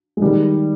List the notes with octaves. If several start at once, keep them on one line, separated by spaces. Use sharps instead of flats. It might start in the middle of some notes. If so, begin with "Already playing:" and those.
G#3
D#3 G3